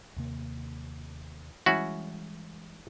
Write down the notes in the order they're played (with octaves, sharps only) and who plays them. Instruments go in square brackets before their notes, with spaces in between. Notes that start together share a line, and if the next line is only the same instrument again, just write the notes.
[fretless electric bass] D#2 C3 A#3
[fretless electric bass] E3 G3 G#3 [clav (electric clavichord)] C#4 E4 F#4